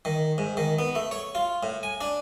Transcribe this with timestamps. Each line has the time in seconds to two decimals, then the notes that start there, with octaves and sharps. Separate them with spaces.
0.05 D#3
0.38 G#2
0.57 D#3
0.79 B3
0.95 A3
1.11 C#5
1.35 F4
1.63 A2
1.83 G#5
2.01 D4